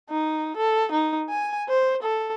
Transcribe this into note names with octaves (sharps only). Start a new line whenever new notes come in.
D#4
A4
D#4
G#5
C5
A4